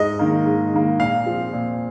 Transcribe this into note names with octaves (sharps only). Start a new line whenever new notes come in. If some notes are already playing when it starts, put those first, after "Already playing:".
Already playing: G#2 D#5
D#3 A#3
G#2
D#3 A#3
A#2 F5
F3 C4
A#2